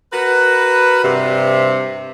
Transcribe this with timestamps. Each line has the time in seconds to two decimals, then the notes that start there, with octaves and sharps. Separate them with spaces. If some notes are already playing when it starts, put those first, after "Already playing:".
0.13 F#4 A#4 B4
1.03 G2 C3